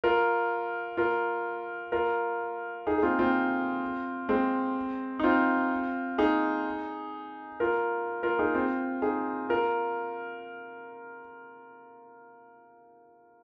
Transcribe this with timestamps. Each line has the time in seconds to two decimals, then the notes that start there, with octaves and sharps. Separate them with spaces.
0.04 F4 A#4
0.97 F4 A#4
1.92 F4 A#4
2.87 D#4 G#4
2.98 G#4
3.03 C4 F4
3.19 C4 F4
4.29 G#3 C4
5.20 D#4
5.24 C4 F4
6.18 D#4 G#4
7.60 F4 A#4
8.23 F4 A#4
8.39 D#4 G#4
8.55 C4 F4
9.02 D#4 G#4
9.49 F4 A#4